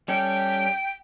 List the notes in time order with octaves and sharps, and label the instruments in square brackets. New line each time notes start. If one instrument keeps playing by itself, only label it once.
[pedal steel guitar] G3 C#4 A4 [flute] G5